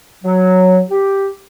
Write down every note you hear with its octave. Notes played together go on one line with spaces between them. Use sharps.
F#3
G4